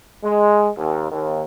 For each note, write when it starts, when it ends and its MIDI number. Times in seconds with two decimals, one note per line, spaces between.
0.24 0.68 56
0.77 1.10 39
1.11 1.44 39